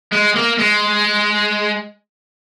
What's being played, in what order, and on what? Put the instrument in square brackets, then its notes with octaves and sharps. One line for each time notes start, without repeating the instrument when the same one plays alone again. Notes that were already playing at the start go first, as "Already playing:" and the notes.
[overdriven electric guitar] G#3
A#3
G#3